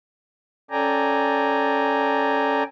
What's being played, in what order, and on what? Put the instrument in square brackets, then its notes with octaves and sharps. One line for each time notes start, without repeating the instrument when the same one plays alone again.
[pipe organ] C#4 A4 D5 G5 G#5 A#5